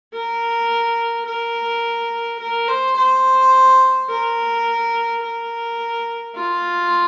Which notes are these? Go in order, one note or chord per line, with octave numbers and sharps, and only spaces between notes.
A#4
A#4
A#4
C5
C5
A#4
A#4
F4